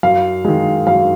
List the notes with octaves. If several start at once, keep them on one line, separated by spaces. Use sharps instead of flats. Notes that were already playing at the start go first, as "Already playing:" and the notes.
F#2 F5
D#3 G#3
F#2 F5